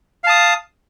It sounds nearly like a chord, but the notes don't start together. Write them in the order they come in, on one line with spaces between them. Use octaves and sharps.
F5 A5 D#6